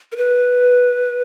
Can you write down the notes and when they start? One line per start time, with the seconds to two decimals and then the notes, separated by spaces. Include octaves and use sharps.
0.12 A#4
0.17 B4